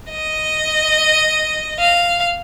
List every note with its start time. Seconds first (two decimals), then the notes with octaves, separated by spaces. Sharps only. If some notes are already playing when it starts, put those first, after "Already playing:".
0.11 D#5
1.79 F5